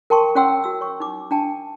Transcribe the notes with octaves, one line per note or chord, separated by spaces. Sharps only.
A#4 G5 A5 C6 C#6
C#4 C#5 F#5 G5 C6 E6
F#4 E6
C#5 C#6
D#4 D6
D4 G5 A5